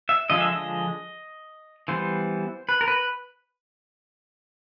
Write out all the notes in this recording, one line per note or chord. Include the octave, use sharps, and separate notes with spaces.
E5
D3 F3 G#3 D#5
E5
D#5
E3 G3 B3 C5
B4
A#4
B4